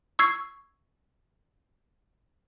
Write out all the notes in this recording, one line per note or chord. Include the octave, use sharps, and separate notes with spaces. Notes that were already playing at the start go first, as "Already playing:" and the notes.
C#6 E6 G#6 C7